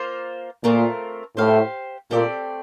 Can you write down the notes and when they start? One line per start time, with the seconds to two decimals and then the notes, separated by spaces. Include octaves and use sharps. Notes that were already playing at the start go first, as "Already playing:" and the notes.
Already playing: A#3 F4 C5
0.64 A#2 A3 C4 F4 A#4
1.37 A2 G4 C5 F5
2.11 A#2 A3 C4 G4 D5